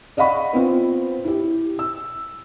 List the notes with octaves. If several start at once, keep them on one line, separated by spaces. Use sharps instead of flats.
D5 D#5 F5 F#5 B5 C#6
B3 C4 F4
E4 G4
E6